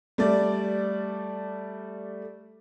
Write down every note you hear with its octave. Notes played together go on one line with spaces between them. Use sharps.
G3 A3 D5